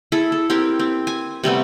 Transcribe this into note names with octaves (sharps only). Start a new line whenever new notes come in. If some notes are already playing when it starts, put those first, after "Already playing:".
E4 G#4 A4
A4
C4 E4 G4 A#4
C4
G#5
C3 G3 A3 B3